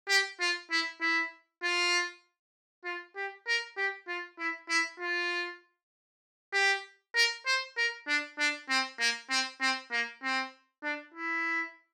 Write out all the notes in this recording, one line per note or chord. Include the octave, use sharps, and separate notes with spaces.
G4
F4
E4
E4
F4
F4
G4
A#4
G4
F4
E4
E4
F4
G4
A#4
C5
A#4
D4
D4
C4
A#3
C4
C4
A#3
C4
D4
E4